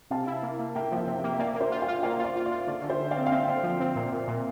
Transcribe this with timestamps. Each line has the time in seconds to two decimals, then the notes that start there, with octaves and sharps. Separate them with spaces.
0.11 C3 F5 A5
0.27 E4
0.43 A#3
0.59 A#3
0.75 A#3 E5 G5
0.92 F3 E5 G5
1.07 C3
1.18 E5 G5
1.24 A#3
1.33 E5
1.39 A#3 D5 F5
1.55 A#3
1.60 C5 E5
1.72 F4
1.82 D5 F5
1.88 F4
2.03 A#3 D5 F5
2.19 F4
2.24 D5
2.36 F4
2.46 D5
2.52 F4
2.67 D3 D5
2.82 D3 D5
2.89 C5 E5
3.00 D3
3.11 D5 F5
3.16 C4
3.27 F5
3.32 C4 E5 G5
3.47 D3
3.63 F3
3.80 C4
3.96 A#2
4.12 A#2
4.28 A#2